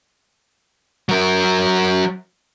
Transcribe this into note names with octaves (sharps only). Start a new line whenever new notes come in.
F#3 A#4